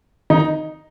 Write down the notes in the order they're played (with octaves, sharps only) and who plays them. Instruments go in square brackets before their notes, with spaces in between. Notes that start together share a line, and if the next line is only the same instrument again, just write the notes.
[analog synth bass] D#3 [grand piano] D#4